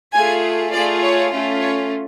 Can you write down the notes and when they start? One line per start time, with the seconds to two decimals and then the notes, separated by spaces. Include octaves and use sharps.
0.13 A3 F4 G#4 G#5
0.72 A3 F4 G#4 D5
1.02 C#5
1.32 A3 C#4 F4
1.61 C#5